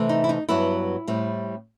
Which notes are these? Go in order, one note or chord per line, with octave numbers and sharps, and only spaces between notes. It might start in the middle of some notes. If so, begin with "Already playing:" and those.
Already playing: C3 E3 A3 C4
D#4
E4
D#4
G2 F#3 B3 E4
A2 G3 C4